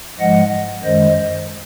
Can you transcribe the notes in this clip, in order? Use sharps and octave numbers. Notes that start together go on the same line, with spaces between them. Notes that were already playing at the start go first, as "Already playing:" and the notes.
G#2 F3 G#3 D#5 F#5
F#2 D#3 G#3 C5 D#5